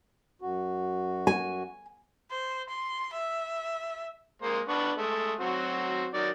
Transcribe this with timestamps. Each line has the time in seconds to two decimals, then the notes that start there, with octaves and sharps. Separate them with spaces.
0.41 F#2 F#4
1.27 G#5
2.31 C5
2.70 C6
3.14 E5
4.42 G#3 A#3 C5
4.68 B3 D4 C#6
4.97 G#3 A3
5.40 F#3 C4 F#4
6.14 D#3 F#3 D5